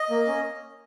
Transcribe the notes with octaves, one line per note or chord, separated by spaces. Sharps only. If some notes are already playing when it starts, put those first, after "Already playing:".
Already playing: D#5
A#3
C#4